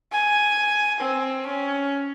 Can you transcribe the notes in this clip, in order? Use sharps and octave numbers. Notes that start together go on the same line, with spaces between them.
G#5
C4
C#4